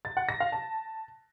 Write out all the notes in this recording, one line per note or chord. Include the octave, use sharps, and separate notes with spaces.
A6
F#5
A#6
F5
A5